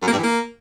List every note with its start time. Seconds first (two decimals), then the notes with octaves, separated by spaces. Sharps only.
0.02 F#2
0.07 A#3
0.13 G2
0.18 E3
0.23 A#3